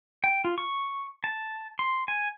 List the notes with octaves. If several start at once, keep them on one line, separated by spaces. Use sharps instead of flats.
G5
F4
C#6
A5
C6
G#5